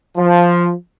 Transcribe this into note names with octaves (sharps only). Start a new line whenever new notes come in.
F3